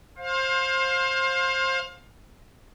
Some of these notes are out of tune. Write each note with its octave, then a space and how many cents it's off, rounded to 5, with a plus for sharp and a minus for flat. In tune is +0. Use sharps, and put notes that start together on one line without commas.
C5 +20 F5 +25